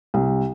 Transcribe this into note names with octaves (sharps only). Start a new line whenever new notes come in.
C2